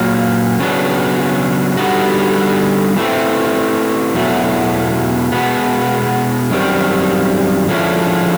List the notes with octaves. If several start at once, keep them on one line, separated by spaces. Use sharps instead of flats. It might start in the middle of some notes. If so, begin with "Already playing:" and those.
Already playing: A#2 F#3 A#3
C#3 F#3 B3 D4
D3 G3 B3 D#4 F#4
E3 A3 C4
E2 B2 F#3 A3
B2 G#3 B3
F#2 D#3 G3 C4
D3 F3 G#3 C#4 E4